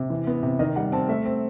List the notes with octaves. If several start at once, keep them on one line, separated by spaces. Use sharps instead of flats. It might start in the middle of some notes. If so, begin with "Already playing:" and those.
Already playing: C3
E3
B3
C3
D#3 D#5
G3 F#5
C4 A5
A3 E5
C4